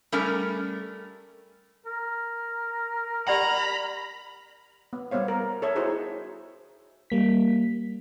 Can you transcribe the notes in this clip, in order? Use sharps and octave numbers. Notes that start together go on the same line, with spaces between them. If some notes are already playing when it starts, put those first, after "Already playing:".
G3 A3 C#4 A#4
A#4
G4 D5 F#5 A#5 B5
B3
G3 B3 C5 C#5 F5
A#4
A4 C#5 E5
D#4 E4 F#4 G#4 C5 C#5
G3 A#3 B6